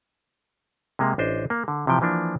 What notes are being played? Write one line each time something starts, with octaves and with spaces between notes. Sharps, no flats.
C3 G#3 A#3
A1 D4 C5 D#5
A#3
D3
C3 E3 F3 G5
E3 F3 A#3 D4